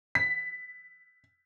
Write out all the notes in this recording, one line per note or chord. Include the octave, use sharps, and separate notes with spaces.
B6